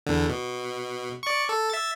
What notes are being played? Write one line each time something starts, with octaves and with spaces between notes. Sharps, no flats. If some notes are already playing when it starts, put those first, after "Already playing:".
E2 D3
B2
D5 C#6
A4
E5 A6